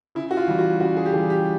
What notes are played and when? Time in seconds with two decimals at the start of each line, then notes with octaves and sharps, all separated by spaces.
0.15 C#3 E4
0.31 F#4
0.37 F4
0.48 E3 G3
0.59 F#4
0.80 C#3 F#4
0.97 G#4
1.06 G4
1.13 E3 G#4
1.18 G3
1.30 G4